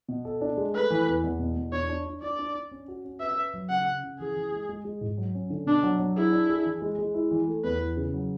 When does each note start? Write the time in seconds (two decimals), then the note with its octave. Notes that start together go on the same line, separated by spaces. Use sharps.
0.08 B2
0.25 A4
0.41 D4
0.57 G#3
0.74 A3 B4
0.90 E3
1.07 E2
1.24 E2
1.39 B2
1.57 E2
1.72 D4 C#5
1.89 D4
2.06 D4
2.22 D4 D5
2.39 D4
2.55 D4
2.71 C#4
2.88 F#4
3.05 C#4
3.20 B4 E5
3.37 B4
3.54 F#3
3.69 C#3 F#5
3.86 C#3
4.03 C#3
4.19 E3 G#4
4.35 E3
4.52 G#3
4.69 G#3
4.85 G#3
5.01 G#2
5.17 F#3
5.35 C#4
5.50 D3
5.66 B2 D4
5.83 F#3
5.99 F#3
6.17 E4 G#4
6.32 D4
6.49 G#4
6.65 E3
6.82 G#3
6.98 G#3
7.14 E4
7.31 E3
7.48 A3
7.64 E2 B4
7.81 E3
7.97 C#3
8.14 F#3